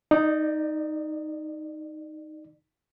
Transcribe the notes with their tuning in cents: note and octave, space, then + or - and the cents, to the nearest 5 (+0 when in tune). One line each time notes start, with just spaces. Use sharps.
D#4 +0 D5 +30